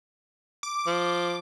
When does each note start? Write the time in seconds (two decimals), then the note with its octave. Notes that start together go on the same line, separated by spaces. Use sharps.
0.63 D6
0.87 F3